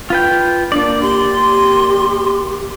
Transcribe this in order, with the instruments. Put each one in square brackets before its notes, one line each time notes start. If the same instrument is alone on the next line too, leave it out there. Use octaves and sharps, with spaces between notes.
[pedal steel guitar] F4 B4 G5
[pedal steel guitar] A#3 D5 [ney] D4
[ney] G4 [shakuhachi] C6